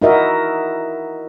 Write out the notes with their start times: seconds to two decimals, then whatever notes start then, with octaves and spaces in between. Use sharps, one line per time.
0.02 D#4 E4 F#4 A#4 D#5 E5